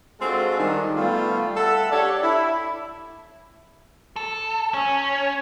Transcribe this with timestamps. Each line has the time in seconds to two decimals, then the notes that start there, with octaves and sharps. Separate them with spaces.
0.21 G#3 C4 D4 F4 F#4 A4
0.58 D#3 G3 D4
0.95 G3 A3 B3 F4
1.56 A4 E5 F#5 A5
1.90 D4 G4 A4 C#5 D5
2.21 E4
4.16 A4
4.74 C#4